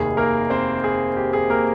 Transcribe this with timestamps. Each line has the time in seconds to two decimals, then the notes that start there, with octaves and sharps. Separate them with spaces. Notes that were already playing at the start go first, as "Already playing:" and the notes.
Already playing: F1 D#2 D#3 G#4
0.17 A#3 A#4
0.50 C4 C5
0.84 G#4
1.17 G4
1.33 G#4
1.50 A#3 A#4